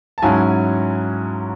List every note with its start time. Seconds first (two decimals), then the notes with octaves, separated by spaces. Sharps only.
0.18 A5
0.22 G#2 F#3 C#4 E4 G#5